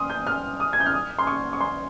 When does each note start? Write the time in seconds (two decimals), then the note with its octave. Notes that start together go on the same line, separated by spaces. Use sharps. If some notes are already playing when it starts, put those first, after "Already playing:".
Already playing: C6 D#6 F6
0.10 G6
0.27 F6
0.60 D#6
0.73 G#6
0.80 G6
0.86 F6
0.94 D#6
1.19 C6
1.27 C#6
1.53 C#6
1.61 C6